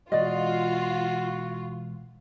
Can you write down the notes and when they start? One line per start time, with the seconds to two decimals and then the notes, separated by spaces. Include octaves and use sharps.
0.12 B2 E3 G#3 F4 F#4 D5 D#5